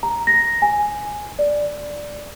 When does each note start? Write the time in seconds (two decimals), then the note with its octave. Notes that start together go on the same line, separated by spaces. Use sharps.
0.03 A#5
0.27 A#6
0.62 G#5
1.39 D5